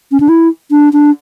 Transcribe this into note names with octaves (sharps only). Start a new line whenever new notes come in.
C#4
D4
E4
D4
D4